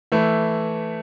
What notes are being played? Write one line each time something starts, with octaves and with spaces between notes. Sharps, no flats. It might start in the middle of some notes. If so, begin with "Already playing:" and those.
E3 A3 E4